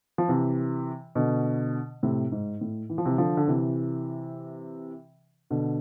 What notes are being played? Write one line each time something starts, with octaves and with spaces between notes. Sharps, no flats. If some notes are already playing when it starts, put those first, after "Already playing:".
F3
C3 E3
B2 D3
A2 C3
G#2
A2
E3
F3
C3 E3
D3 F3
D3
C3 E3
B2 D3